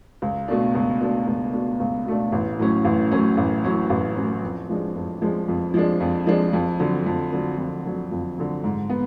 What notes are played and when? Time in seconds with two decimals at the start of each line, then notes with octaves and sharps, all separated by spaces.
0.22 C#2
0.48 B2 A3 D4
0.75 C#2
1.01 B2 A3 D4
1.27 C#2
1.53 B2 A3 D4
1.80 C#2
2.06 B2 A3 D4
2.32 A1
2.59 A2 F#3 C#4
2.85 A1
3.11 A2 F#3 C#4
3.37 A1
3.64 A2 F#3 C#4
3.90 A1
4.16 A2 F#3 C#4
4.43 F2
4.69 F3 G#3 D4
4.96 F2
5.22 F3 G#3 D4
5.48 F2
5.74 F3 G#3 D4
6.00 F2
6.26 F3 G#3 D4
6.53 F2
6.79 D3 F#3
7.06 F2
7.32 D3 F#3
7.58 F2
7.85 D3 F#3
8.11 F2
8.38 D3 F#3
8.64 G#2
8.90 B3